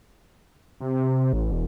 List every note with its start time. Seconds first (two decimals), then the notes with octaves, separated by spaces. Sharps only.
0.81 C3
1.33 A1
1.52 E1